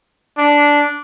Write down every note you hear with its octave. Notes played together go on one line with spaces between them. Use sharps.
D4